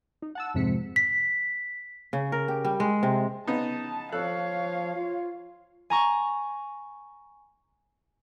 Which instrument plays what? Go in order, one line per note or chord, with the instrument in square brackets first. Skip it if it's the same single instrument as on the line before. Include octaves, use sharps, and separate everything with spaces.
[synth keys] D#4
F#5 A5 E6
F2 G#2 C3 B6 C#7
[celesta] B6
[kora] C#3
A#4
G4
G3
G#3
C3
[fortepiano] C#3 B3 D#4 [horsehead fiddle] A5
[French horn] F3 [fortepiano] A4 F#6 [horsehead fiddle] C#5 F5
[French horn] F4
[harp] G#5 A#5 C#6